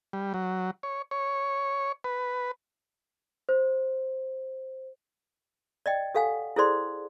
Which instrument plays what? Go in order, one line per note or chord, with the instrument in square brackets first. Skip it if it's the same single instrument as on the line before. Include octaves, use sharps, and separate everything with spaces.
[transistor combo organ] G3
F#3
C#5
C#5
B4
[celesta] C5
[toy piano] D5 D#5 G5
G4 A4 F5 F#5 G#5
E4 G#4 A4 C5 D5 C6